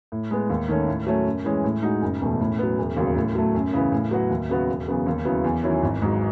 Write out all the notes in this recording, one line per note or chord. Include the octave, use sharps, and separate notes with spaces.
A2
G#3 B3
D#2
D#3 A3 C#4
A2
F#3 A3 C#4
F#2
E3 G#3 C#4
A2
G#3 D#4 F#4
F#1
E2 B2 A3
A2
F#3 B3
E1
D#2 C#3 F#3
A2
F#3 A3
F#2
C#3 E3 B3
A2
F#3 B3 F#4
D#2
C#3 F#3 B3 F#4
E1
E2 C#3 F#3 B3
D#2
C#3 F#3 B3 E4
E2
D#3 F#3 C#4 E4
G#1
G#2 F#3